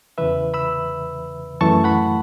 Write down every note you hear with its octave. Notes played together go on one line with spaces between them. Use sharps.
E2 C#3 E3 B4 E5
B5 E6
F#2 E3 A3 E4 A5 C#6
F#5 B5